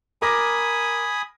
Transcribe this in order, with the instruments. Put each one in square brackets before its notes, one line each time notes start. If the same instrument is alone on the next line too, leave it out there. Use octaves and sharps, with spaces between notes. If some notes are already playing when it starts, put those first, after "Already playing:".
[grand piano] A#4 D6 A#6 [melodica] G#5 B5 D#6